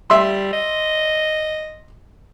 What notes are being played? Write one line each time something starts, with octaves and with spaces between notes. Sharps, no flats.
G3 E5 C6
D#5